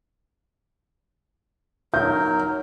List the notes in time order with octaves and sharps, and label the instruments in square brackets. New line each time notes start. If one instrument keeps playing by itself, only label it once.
[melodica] F#3 A#4 [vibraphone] D#4 C#5 [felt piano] G6